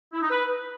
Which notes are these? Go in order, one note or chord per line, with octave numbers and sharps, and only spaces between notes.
E4
D#4
B4